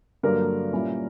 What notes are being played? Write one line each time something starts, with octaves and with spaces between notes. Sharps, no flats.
G2 D3 F#3 A#3 A#4
A#2 G3 C#4 E4